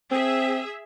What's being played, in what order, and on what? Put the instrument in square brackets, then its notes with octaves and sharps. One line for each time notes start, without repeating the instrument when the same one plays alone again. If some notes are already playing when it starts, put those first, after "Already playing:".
[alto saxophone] C4 [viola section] G#4 E5